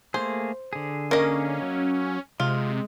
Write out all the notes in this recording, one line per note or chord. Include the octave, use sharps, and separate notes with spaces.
A3 A#3 G#4 C5
D3 G#4
A#3 C#4 D#5
F#3
C3 G#3 F4